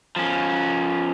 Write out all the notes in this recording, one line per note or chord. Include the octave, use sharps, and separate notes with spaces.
F3 C#4